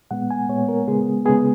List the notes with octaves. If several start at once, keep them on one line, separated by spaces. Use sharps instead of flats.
A#2 G#3 B3 F#5
G#5
A#2 G#3 B3 C#5
A#4
C#3 G#3 B3 G#4
C#3 G#3 B3 G#4